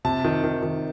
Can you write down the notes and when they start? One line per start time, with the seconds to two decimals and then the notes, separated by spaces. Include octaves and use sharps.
0.05 C3 A5
0.25 D#3
0.44 D#3
0.63 D#3